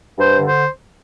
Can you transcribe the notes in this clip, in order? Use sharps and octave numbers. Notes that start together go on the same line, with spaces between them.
G2 C5
D3
C5